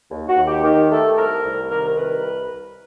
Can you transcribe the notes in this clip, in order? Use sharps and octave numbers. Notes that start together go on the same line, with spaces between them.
D#2
F#4
D#2
G4
D#3 G4
A3 A4
C2 A#4
C2
D#3 A#4
A#4
C2 B4